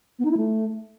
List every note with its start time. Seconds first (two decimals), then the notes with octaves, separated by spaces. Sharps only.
0.19 B3
0.25 D#4
0.31 E4
0.37 A3